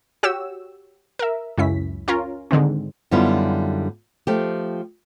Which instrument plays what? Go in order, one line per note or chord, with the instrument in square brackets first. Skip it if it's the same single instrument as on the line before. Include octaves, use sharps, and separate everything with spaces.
[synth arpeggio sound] F#4 G4 C#5 E6
A#4 E5
C#2 F#2 C#4 E4 B6
C#4 F4 A#4
G#2 D3 D#3 C4
[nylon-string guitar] F#2 D3 G3 B3 E4 F4
F3 A3 G4